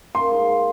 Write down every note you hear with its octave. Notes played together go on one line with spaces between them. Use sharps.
A#3 C6
G#2